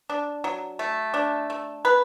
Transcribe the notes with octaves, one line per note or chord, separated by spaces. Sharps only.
D4
F#3
A3
D4
A3
B4